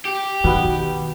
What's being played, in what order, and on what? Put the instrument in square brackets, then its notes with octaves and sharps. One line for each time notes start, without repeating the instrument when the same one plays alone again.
[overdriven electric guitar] G4
[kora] B2 B3 [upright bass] D#3